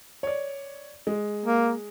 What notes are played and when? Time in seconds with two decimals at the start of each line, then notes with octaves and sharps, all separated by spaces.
0.23 C#5 D5
1.07 G#3
1.45 A#3